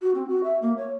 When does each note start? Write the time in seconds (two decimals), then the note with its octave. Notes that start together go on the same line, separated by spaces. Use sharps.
0.02 F#4
0.15 C4
0.28 F#4
0.44 E5
0.62 A#3
0.77 C#5